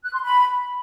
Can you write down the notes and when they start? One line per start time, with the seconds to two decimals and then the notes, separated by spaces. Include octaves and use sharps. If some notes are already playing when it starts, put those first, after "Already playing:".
0.04 F#6
0.13 C6
0.22 B5